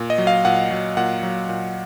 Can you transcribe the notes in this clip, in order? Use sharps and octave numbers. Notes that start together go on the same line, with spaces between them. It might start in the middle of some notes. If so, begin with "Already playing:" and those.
Already playing: A#2
D#5
F#3
F5
A#2 F#5
F#3
A#2 F#5
F#3
A#2